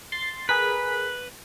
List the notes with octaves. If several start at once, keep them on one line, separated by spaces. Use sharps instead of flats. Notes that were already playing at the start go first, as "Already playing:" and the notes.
C6 A6
G#4 A#4 B4 B6